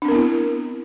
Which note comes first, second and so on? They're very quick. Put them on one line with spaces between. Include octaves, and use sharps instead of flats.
D4 C4 A#4 B3 E4